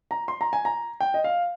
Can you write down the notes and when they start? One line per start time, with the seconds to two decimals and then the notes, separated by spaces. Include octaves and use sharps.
0.11 A#5
0.28 C6
0.41 A#5
0.53 G#5
0.65 A#5
1.01 G5
1.14 D#5
1.24 F5